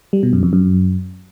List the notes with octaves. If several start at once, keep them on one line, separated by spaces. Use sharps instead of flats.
G3
B2
F#2
F2
F#2